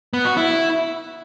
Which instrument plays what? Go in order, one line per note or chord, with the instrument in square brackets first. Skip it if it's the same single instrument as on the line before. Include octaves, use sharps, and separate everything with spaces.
[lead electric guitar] B3
F#4
E4